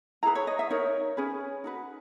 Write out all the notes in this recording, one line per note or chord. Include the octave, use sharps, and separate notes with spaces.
E4 G#4 B4 A#5
C#5
D#5
E5
D#4 A#4 C#5
C#4 G#4 B4
D#4 F#4 B4